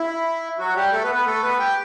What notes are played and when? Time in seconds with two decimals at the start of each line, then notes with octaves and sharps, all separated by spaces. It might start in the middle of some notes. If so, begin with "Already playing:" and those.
Already playing: E4
0.59 F#3 F#4
0.75 G3 G4
0.93 A3 A4
1.03 B3 B4
1.14 B3 B4
1.26 A3 A4
1.43 B3 B4
1.59 G4 G5